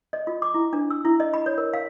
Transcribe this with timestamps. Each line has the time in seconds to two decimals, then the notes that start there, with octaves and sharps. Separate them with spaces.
0.13 D#5
0.27 F4
0.42 D6
0.54 E4
0.73 D4
0.91 E6
1.05 E4
1.20 D#5
1.34 B5
1.46 C#5
1.58 A#4
1.74 F5